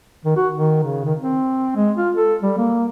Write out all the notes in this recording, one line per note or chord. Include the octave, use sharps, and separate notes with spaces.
D#3
F#4
D#3
C#3
D#3
C4
G#3
F4
A4
G3
A#3